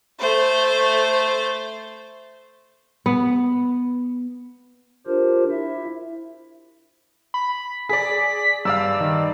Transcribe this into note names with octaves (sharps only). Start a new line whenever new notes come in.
A3 C5
B3
D4 F4 G4 A#4 C5
E4 E5
B5
G#4 D5 B6
G2 D5 F5 E6
D#3